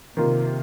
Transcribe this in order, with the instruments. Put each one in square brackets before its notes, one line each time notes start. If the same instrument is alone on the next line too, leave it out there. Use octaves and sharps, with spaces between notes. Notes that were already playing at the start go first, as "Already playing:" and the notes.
[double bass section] C3 [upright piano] D#3 A#3 F4